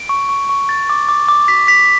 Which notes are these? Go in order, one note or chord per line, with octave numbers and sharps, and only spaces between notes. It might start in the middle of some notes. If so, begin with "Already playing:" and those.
Already playing: D7
C#6
C#6
C#6
A6
D6
D6
D6
B6
B6